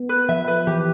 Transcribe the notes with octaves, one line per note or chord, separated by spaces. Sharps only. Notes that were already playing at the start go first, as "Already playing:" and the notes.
Already playing: B3
B4
F3 E5
B4
E3 G4